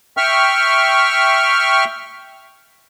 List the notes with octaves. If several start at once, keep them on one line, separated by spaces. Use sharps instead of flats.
E5 G5 C#6 F6